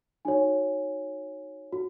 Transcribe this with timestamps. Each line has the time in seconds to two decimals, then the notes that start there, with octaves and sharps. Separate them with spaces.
0.25 D#4 F#4 C#5 G#5
1.72 F#4